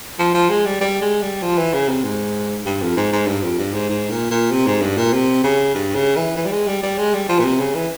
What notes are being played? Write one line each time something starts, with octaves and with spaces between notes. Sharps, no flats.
F3
F3
G#3
G3
G3
G#3
G3
F3
E3
C#3
C3
G#2
G2
F2
G#2
G#2
G2
F2
G2
G#2
G#2
A#2
A#2
C3
G#2
G2
A#2
C3
C#3
G2
C#3
E3
E3
G3
G#3
G3
G3
G#3
G3
F3
A#2
C3
C#3
E3